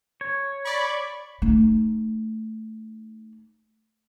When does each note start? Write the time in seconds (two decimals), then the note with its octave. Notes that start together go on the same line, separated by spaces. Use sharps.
0.21 C#5
0.65 D5 B5 C#6
1.42 A3 D#4